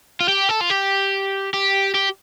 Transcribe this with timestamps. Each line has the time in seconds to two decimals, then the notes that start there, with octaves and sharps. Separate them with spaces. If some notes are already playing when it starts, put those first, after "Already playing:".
0.20 F4
0.28 G4
0.49 A4
0.61 F4
0.70 G4
1.54 G4
1.95 G4